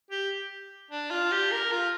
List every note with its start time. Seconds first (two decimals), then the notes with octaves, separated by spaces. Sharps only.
0.11 G4
0.91 D4
1.11 F4
1.32 G4
1.52 A#4
1.72 F4